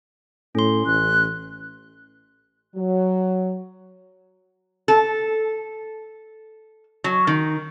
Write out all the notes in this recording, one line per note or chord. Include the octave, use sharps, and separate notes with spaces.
A2 C#4 C6
A1 F#6
F#3
A4
F#3
D#3